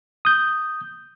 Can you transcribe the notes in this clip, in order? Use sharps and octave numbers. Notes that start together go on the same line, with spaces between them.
D#6 G6